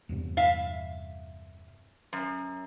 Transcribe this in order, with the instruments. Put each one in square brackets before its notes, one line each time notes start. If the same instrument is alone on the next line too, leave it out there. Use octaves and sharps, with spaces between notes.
[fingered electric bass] E2 G2 C3
[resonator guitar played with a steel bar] E5 F5
F#2